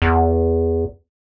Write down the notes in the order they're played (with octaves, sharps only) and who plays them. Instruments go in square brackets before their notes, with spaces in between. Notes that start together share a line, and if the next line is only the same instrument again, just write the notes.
[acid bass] E2